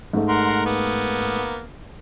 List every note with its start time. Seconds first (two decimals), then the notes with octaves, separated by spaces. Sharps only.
0.13 G#2 A3
0.29 A#4 F#5 C6
0.65 A#3 B3